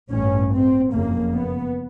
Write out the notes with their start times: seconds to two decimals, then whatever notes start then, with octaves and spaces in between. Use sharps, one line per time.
0.13 A1 G2 C#4
0.53 C4
0.93 F#1 F2 C#3 A#3
1.34 B3